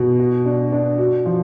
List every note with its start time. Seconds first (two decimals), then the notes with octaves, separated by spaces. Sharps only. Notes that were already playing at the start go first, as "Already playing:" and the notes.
Already playing: B2
0.20 F#4
0.46 D4
0.72 D4
0.98 F#4
1.25 F3